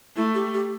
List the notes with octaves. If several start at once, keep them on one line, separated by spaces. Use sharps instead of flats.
A3 E4
G4
G4